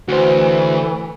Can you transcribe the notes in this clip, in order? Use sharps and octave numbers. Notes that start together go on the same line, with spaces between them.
D2 E3 F#4 C5